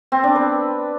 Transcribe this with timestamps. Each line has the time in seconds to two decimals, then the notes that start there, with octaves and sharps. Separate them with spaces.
0.12 C4
0.24 D4
0.35 B4